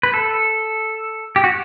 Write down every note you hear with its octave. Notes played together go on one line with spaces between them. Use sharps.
B4
A4
G4
F#4